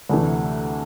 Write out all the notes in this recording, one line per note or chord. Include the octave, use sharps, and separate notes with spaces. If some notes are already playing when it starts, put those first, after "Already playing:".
D2 C3 E3 A3 E4